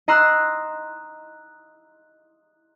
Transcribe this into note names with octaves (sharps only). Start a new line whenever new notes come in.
D#5 A#5 C6 E6 F#6